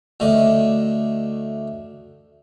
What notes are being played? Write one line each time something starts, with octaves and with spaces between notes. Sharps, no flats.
D2 A3 D4 D#5